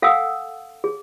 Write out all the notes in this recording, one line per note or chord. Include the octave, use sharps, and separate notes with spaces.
A4 F5 F#5 G#5 D#6 E6
G#4